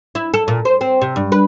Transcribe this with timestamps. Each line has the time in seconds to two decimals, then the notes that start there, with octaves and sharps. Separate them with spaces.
0.15 E4
0.34 A4
0.48 A#2
0.65 C5
0.81 C4
1.02 C3
1.16 G2
1.32 B4